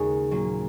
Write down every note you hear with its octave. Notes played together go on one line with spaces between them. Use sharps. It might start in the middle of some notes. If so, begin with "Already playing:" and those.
Already playing: D#2 C#3 G#3 F#4 A#4
A#2 F#3 A#3